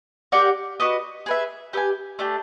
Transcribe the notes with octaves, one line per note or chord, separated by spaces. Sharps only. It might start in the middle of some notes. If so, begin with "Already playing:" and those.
G4 A#4 D5 F#5
F#4 B4 D#5
G#4 B4 E5
G4 B4 E5 G#5
A3 D4 G4